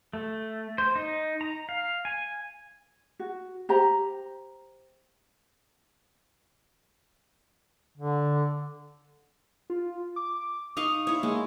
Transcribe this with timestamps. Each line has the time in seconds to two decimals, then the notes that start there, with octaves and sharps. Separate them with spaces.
0.13 A3
0.78 C5
0.96 D#4
1.41 A#5
1.69 F5
2.05 G#5
3.20 F#4
3.69 G4 C5 A#5
7.97 D3
9.70 F4
10.16 D6
10.77 D#4 F5 C#6 D#6
11.07 E4 C#5
11.23 G#3 A#3